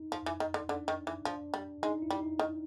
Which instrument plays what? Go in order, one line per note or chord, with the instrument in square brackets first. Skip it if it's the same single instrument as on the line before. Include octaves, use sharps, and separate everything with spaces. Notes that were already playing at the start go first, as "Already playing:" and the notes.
Already playing: [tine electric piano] D#4
[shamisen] F3
E3
D#3
D3
[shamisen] D3 [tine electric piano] D4
[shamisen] D#3
E3
[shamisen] F3 [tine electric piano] D4
[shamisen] G3
[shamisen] G#3 [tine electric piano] D#4
[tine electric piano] E4
[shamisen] G3
[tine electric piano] D#4
[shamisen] D#3